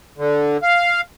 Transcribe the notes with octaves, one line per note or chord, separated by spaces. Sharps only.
D3
F5